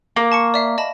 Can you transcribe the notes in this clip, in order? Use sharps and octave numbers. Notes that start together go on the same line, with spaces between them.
A#3
A5 C#6 C#7
D5 E5 F5
D#5 A5 B5